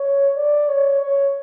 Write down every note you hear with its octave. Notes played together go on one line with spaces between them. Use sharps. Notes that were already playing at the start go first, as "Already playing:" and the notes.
Already playing: C#5
D5
C#5
C#5